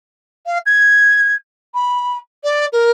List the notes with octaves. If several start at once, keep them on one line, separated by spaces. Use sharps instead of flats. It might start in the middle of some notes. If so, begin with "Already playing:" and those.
F5
G#6
B5
D5
A#4